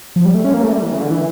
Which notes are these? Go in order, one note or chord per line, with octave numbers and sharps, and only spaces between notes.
F3
G3
A3
C#4
A#3
A3
G3
E3
C#3
D3
E3